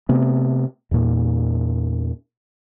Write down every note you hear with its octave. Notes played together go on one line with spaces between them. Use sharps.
C3 A3 B3
E2 A#2